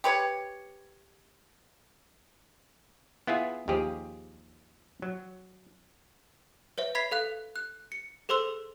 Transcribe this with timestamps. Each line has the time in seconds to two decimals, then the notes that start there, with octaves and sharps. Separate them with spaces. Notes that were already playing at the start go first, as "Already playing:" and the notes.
0.04 G4 B4 C#5
3.27 B3 E4 F4 G#4
3.68 D#2 F3 G4 G#4
5.02 F#3
6.78 B4 C#5 E5
6.95 E5 B5 G#6 B6 C7
7.11 A4 F5 F#6
7.56 F#6
7.92 C#7
8.29 G#4 A4 C5 C6 E6 G7